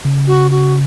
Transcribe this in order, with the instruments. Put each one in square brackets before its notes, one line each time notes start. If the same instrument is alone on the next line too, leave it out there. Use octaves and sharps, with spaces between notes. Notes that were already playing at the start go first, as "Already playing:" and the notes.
[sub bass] C#3
[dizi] F#4
F#4